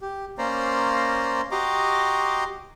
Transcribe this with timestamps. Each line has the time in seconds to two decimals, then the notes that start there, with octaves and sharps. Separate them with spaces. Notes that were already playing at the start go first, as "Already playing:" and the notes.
0.01 G4
0.38 A#3 C#4 C5 D5 A#5 C6
1.51 F#4 G4 D#5 A#5 C6 D6